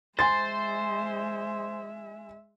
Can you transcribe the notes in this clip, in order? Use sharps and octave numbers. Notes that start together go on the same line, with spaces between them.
G#3 C5 E5 G#5 C6 A6